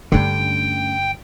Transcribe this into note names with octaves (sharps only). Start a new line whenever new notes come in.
G2 D3 A3 C#4 G5